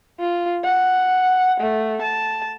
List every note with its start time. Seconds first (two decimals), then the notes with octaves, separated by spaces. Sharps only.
0.20 F4
0.64 F#5
1.60 A3
2.02 A5